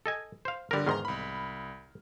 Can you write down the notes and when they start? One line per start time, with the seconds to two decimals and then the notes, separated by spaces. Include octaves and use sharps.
0.06 A4 D#5 G#5
0.45 C5 F5
0.71 G1 D3 G3 A#4
0.87 E2 G#2 D#3 A#5 C6 F6
1.05 C2 B5